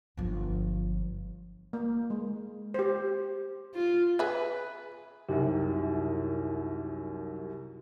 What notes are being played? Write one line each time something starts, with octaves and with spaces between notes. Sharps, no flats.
G1 F3
A#3
G#3
G4 C5
F4
G#4 B4 E5
C2 F#2 D#4 G4